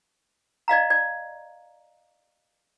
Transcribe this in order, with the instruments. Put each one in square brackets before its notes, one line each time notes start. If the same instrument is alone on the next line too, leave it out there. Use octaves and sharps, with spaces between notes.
[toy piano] D5 D#5 F5 A#5
D5